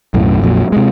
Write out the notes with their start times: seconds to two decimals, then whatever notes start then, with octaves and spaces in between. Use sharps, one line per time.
0.14 B1 F#2 A2
0.42 A#1 F2 A#2 F#3
0.72 C3 G#3